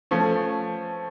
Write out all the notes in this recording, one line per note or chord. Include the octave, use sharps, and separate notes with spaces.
F3 A3 C#4